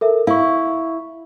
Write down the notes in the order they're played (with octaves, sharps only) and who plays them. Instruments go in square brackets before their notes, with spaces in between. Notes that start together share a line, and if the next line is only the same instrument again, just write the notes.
[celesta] A4 A#4 E5
[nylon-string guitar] E4 [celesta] F5 C#6